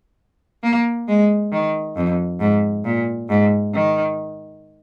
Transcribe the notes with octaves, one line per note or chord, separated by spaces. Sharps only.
A#3
G#3
D#3
F2
G#2
A#2
G#2
D#3